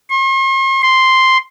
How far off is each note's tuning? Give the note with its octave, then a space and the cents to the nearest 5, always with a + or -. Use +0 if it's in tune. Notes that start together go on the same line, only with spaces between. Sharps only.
C6 +45
C6 +0